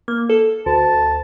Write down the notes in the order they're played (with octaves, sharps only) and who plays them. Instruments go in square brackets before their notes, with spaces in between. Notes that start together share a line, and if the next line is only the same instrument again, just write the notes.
[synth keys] A#3
A4
[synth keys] D2 [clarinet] A5